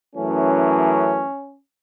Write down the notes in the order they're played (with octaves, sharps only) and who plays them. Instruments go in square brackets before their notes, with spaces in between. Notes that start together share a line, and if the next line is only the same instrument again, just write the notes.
[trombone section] F#2 E3 A3 C#4